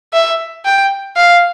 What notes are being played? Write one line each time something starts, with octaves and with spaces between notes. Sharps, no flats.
E5
G5
F5